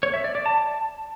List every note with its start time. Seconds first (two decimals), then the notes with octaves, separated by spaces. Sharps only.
0.03 C#5
0.14 E5
0.24 D5
0.35 D5
0.46 A5